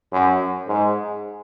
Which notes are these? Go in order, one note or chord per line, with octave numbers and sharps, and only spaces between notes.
F#2
G#2